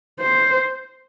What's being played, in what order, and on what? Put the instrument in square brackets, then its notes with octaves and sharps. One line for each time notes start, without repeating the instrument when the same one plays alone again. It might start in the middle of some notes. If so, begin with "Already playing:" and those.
[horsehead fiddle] C5